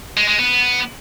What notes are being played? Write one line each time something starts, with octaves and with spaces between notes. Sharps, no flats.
G#3
G#3
B3